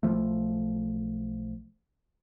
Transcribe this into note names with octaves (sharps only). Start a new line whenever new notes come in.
B1 F3 A3